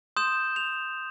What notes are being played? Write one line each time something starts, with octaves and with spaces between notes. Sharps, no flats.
C6 D#6 G6 E7
F7